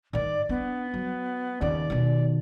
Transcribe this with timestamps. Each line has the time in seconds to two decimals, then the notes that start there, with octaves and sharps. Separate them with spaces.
0.13 G#2 D#3 D5
0.49 B3 D4
0.94 F#3
1.61 D#2 C#3 D5
1.90 B2 D#3